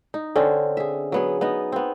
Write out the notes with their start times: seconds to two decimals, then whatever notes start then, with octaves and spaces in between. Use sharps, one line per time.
0.14 D#4
0.36 D3 C4 C#4
0.77 G#4 E5
1.12 F#3 B3 G#4
1.41 B3 D#4 D#5
1.72 B3 C4